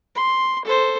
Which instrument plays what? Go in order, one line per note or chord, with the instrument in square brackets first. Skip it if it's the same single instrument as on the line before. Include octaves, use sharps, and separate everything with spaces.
[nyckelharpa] C6
A4 C5